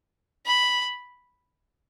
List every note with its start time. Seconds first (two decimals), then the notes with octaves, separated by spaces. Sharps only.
0.46 B5